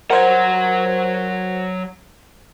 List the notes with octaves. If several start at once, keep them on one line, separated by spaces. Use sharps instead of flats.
F#3 A#4 C5 F#5 G#6